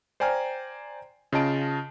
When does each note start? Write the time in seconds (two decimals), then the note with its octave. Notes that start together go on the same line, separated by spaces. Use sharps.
0.20 C5 D5 G5 G#5 A#5 F6
1.33 C#3 F4 D#5 A5 D7